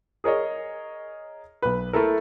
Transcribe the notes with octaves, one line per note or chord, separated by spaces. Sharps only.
G#4 A#4 C#5 D#5
B1 B4
A3 E4 A4 A#4